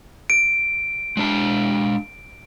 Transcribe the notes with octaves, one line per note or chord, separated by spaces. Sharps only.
D7
G#3 D4 A5